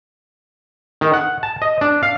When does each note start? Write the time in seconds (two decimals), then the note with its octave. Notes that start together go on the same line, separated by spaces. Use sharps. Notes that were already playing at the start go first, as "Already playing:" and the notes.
1.01 D#3
1.14 F#5
1.43 A5
1.62 D#5
1.81 D4
2.03 F5